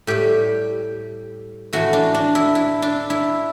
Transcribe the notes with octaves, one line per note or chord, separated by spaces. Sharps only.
A2 G3 G4
A2 E3 A3 F#4
D4
D4
E4
E4
D4
E4